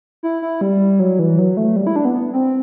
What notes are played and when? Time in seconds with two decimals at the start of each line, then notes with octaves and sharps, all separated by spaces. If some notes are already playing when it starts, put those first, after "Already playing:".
0.23 E4
0.42 E4
0.61 G3
1.00 F#3
1.19 E3
1.39 F#3
1.57 A3
1.76 G3
1.87 E4
1.96 D4
2.05 B3
2.33 C4